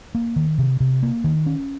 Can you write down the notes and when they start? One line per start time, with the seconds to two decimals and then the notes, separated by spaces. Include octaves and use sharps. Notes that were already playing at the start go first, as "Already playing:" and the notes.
0.15 A#3
0.36 D#3
0.58 C3
0.80 C3
1.03 A#3
1.24 D#3
1.46 C#4